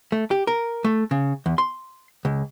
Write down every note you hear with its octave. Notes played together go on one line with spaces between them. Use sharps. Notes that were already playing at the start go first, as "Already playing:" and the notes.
A3
G4
A#4
A3
C#3
E2
C6
C#2